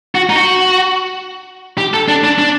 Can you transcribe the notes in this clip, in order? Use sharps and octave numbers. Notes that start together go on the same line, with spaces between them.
F#4
D#4
F#4
G4
A4
D4
D4
D4